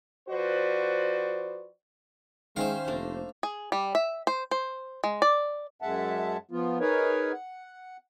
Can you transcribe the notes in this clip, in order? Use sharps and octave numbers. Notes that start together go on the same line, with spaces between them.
F3 F#4 B4 C5 D5
D#3 G#3 C#4 C5 E5 F5
F1 A3 A#3 D4
G#4
G3
E5
C5
C5
G#3
D5
F#2 G#3 E5 F#5 A5
F3 B3 F4
D#4 G#4 A#4 B4 C#5
F#5